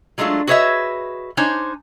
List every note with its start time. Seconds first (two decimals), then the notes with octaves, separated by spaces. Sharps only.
0.18 F#3 G#3 A3 D4 F4
0.47 F#4 G#4 B4 C#5 D#5 E5
1.37 D4 D#4 C5 C#5 G#5